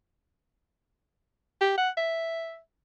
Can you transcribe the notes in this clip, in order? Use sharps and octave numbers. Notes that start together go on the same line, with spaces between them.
G4
F#5
E5